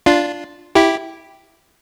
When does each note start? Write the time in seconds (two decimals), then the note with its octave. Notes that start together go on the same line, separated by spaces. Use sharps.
0.06 D4 F4
0.75 E4 G4